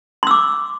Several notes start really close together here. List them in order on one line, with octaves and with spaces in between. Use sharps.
C6 E6 D6